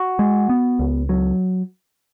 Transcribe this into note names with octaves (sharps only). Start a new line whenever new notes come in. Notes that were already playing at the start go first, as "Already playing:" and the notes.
Already playing: F#4
G#3
B3
C#2
F#3